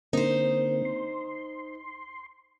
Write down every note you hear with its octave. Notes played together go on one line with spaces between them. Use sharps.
D3 A#3 C4 D#4 C5
C6